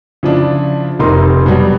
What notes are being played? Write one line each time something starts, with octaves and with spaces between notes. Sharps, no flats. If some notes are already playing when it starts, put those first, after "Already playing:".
C#3 F3 D4 E4
F1 C3 D#4 A#4 C6
B2 F#3 G3